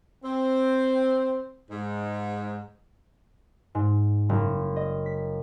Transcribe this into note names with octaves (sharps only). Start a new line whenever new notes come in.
C4
G#2
G#2
F#1
D#5
B6